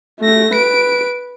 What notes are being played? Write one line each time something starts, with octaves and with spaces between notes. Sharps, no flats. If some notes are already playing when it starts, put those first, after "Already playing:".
A3 A#6
B4 D7